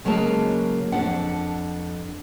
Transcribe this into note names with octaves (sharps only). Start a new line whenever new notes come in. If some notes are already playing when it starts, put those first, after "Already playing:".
C#3 F#3 G#3 A#3 A5
F2 D4 F#5